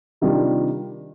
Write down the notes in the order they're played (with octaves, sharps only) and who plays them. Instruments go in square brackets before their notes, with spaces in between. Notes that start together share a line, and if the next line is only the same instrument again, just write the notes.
[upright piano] C3 D#3 G3 D4 F4